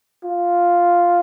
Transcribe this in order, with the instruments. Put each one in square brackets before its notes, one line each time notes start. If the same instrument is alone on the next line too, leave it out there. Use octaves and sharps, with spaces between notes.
[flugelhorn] F4